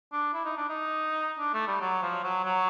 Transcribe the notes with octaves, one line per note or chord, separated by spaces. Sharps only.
D4
E4
D#4
D4
D#4
D4
A3
G3
F#3
F3
F#3
F#3